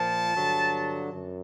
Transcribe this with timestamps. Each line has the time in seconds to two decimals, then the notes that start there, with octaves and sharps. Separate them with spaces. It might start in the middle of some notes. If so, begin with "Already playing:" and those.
Already playing: A#2 F3 A5
0.33 G2 D3 F#3
1.13 F#2